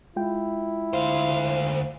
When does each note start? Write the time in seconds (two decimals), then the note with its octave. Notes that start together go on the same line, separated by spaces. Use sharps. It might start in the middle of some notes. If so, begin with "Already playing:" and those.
0.16 G#3 E4 F4 G5
0.93 D2 C5 F5